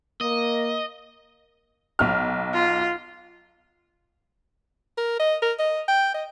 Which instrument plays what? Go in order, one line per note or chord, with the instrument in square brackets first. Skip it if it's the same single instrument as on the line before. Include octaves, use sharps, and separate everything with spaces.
[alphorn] A#3 [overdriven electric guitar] D#5
[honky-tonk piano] B1 F6
[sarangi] F4
[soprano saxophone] A#4
D#5
A#4
D#5
G5
D#5